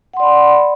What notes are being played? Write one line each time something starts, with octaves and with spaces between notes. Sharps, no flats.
D5 F#5 B5 C6